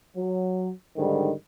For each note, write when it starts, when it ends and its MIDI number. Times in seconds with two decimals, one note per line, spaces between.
0.16 0.69 54
0.97 1.31 44
0.97 1.31 50
0.97 1.31 51
0.97 1.31 55